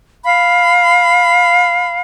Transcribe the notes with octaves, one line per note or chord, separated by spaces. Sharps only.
F5 B5